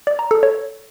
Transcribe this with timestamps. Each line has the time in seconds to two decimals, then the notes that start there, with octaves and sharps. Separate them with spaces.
0.07 D5
0.19 A#5
0.31 A4
0.43 C#5